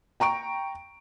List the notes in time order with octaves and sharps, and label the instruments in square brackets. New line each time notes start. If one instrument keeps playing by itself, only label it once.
[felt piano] G5 A#5 C#6 D7